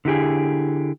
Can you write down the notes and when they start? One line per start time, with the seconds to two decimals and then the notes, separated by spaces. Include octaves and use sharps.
0.05 D3 E4 G4 G#4